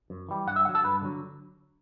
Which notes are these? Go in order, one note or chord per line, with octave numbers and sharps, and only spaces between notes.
F#2
E3 G3
G2 F#5
E5
D3 F#3 F#5
A4
G2 B4
D3 F#3